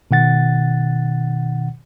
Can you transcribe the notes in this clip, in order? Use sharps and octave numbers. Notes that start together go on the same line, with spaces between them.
B2 D#3 F#5 A6